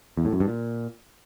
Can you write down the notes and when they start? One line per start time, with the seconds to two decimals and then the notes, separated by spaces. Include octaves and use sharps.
0.17 E2
0.25 A2
0.33 F#2
0.40 G2
0.48 A#2